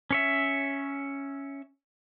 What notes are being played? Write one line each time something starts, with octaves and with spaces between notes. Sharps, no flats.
C#4 C#5 E5